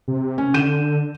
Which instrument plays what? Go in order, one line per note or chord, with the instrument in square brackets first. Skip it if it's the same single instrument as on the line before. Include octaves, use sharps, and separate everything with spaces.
[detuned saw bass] C3
[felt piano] C#4
[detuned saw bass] D3 [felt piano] G6 D#7 E7